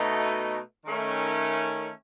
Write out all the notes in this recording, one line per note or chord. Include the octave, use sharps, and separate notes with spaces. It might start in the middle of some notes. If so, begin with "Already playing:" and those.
Already playing: B2 A3 D#4
D#3 A3 C#4